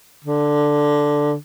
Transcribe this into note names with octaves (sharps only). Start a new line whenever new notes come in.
D3